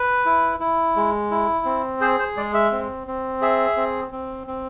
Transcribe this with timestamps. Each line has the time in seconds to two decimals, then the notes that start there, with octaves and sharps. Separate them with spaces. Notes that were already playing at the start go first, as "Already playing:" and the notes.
Already playing: B4
0.26 E4
0.60 E4
0.96 G#3
1.31 E4
1.65 C4
2.01 G#4 C5
2.19 C5
2.37 G#3 D5
2.54 E5
2.72 C4
3.07 C4
3.42 G#4 E5
3.77 C4
4.12 C4
4.47 C4